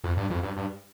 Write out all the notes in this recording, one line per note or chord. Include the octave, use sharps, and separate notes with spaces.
F2
G2
F2
G2
G2